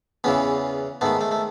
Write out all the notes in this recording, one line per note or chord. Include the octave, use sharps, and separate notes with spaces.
E2 C#3 E3 B3 C#4
G#2 D#3 A3 B3
A3
A3